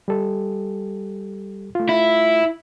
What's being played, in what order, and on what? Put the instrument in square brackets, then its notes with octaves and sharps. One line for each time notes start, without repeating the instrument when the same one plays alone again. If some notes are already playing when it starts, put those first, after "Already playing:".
[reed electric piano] G3 G4 A4
A3 F4
[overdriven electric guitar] E4